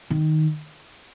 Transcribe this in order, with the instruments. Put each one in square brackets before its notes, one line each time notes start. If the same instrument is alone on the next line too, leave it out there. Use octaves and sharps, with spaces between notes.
[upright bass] D#3